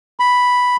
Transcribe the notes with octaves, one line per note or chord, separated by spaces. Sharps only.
B5